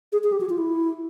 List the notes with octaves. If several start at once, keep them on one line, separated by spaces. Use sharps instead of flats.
G#4
G#4
G4
F#4
F4
E4